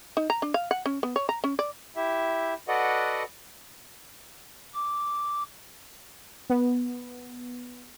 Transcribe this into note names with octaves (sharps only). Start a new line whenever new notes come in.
D#4
A#5
D4
F5
F#5
C#4
B3
C#5
A#5
C#4
D5
E4 G4 E5
F#4 A4 B4 D5 D#5 F#5
D6
B3